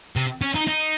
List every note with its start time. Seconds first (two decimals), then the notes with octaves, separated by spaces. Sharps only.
0.16 C3
0.42 C#4
0.55 D#4
0.68 D#4